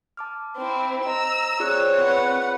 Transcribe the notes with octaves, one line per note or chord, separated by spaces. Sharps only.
A5 D6 F6
C4 E4
C5 D#5 A#5 E6
C4 F4 G#4 C#5 D5 F#6
B4 F#5